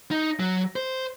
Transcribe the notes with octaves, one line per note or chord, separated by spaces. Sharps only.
D#4
F#3
C5